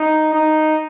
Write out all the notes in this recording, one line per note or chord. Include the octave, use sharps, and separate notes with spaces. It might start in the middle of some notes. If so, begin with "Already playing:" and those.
Already playing: D#4
D#4